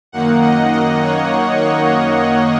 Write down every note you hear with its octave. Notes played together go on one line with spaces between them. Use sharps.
F#2 D#3 A#3 D#4 F#5
D#5
D#5
C#5
C#5